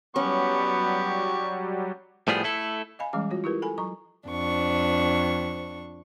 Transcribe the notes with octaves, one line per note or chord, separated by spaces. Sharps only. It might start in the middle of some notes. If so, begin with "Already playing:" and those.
F#3 G3 B3 C#4 G4 C#6
A2 F3 G3 B3 G#4
A3 E4 A4
D#5 F5 G#5 B5
E3 G3 G#3 C#4 G#4 D6
F4 F#4 C#5
E4 F4 G4 A#4 B4
A4 G#5 B5
F#3 A#5 C#6
F2 D4 C#6